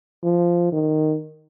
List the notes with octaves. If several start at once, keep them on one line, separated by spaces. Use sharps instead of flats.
F3
D#3